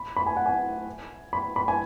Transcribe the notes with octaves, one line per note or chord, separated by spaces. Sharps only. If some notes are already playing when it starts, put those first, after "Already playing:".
Already playing: B5
B5
G#5
F#5
G#5
B5
B5
G#5